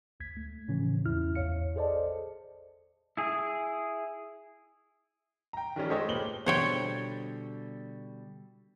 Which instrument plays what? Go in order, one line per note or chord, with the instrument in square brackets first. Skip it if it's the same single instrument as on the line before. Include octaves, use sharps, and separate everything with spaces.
[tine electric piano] A1 D2 G#6 B6
A3
A2 C#3 E3 F3 C#4
E2 G#2 C#4 E4 F6
A1 E2 C#5 F5 C#7
G#4 A4 C5 D5 D#5 A5
[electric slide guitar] E4 G#4
[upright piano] G5 A#5
D#3 F3 G3 C#4
G#3 G4 A4 C5 C#5 D#5
A#2 B4 F#7 G7
[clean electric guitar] B2 D3 G3 [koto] C5 C#5 G5